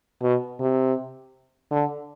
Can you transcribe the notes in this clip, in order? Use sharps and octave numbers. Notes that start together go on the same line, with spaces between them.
B2
C3
D3